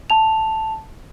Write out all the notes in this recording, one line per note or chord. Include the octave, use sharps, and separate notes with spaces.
A5 F7